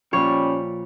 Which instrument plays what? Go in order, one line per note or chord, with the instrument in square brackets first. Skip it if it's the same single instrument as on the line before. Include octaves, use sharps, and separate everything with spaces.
[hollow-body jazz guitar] A#2 F3 [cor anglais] G3 [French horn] C#4 [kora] C#5